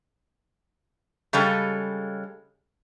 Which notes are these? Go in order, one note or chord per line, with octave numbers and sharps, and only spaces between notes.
C#3 G3 G#3 A4